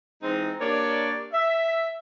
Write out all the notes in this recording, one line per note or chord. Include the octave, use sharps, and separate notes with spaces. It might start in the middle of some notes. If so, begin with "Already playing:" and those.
E3 G#3 C4 D#4
A#3 D4 G4 C#5 D5
E5